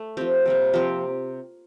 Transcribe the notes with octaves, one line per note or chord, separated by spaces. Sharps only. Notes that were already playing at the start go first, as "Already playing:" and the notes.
Already playing: A3
F3 C4 G4
C3 G3 A#3
F3 C4 G4